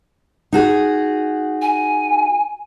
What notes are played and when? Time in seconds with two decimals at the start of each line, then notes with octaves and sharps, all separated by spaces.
0.53 D#4 F#4 G#4
1.62 G#5